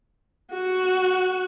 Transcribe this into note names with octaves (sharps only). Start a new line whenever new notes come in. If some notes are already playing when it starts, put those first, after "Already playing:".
F#4